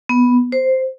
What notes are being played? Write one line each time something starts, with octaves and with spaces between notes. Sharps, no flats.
B3
C5